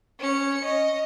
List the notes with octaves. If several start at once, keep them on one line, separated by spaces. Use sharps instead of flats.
C#4 C#7
D#5